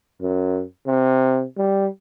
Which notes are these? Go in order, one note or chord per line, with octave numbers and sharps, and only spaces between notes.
F#2
C3
G3